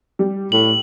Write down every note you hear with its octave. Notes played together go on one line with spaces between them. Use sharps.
G3
A2 F#7